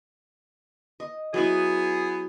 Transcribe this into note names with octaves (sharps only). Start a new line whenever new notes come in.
D#5
F#3 B3 E4 G#4